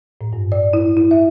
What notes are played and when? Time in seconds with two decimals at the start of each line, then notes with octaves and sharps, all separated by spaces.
0.21 A2
0.33 G2
0.52 D5
0.73 E4
0.97 E4
1.11 E5